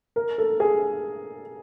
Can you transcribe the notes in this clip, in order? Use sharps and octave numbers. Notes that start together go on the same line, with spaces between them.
A#4
A4
G#4